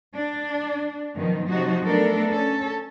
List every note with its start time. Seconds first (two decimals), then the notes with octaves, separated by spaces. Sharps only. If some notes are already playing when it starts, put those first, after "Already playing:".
0.15 D4
1.14 F#2 B2 D#3 F3
1.48 C3 F3 F#3 D#4 F#4
1.85 A3 B3 D4 A4 A#4
2.32 C#4 A4